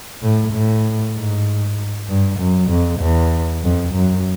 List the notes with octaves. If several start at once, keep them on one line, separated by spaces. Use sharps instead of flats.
A2
A2
G#2
G2
F#2
F2
E2
F2
F#2